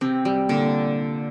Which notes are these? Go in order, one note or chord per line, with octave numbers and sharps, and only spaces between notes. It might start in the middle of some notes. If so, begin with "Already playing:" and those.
C3 C4
G3
A#2 D3